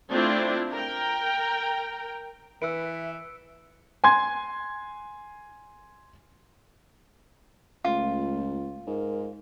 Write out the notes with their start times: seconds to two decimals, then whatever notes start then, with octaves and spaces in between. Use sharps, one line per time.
0.10 A3 C4 D4 E4 F4
0.71 A#4 G5
2.62 E3 B4 E5 E6 C#7 D7
4.04 G#5 C6 G#6
7.84 C#2 A3 F4
8.87 G#2 A#4